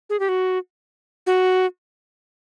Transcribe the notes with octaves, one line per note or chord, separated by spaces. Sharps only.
G#4
G4
F#4
F#4